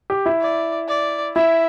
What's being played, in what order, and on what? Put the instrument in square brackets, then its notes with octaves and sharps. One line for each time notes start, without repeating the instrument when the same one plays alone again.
[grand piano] G4
E4
[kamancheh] D5
D5
[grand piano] E4 [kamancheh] E5